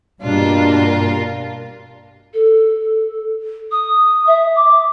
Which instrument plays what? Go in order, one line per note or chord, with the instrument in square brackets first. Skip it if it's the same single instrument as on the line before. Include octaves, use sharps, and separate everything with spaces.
[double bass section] G2 [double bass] B2 [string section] A#3 D4 G4 [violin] F4 A#4
[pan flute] A4
D#6
E5
D6